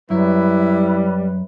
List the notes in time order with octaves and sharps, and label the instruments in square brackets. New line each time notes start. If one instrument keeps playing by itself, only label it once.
[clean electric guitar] F#2 [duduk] G3 [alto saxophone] E4 [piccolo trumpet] B4